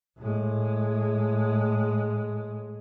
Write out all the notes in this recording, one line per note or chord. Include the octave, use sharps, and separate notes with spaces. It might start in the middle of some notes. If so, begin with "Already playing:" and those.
A2 G#3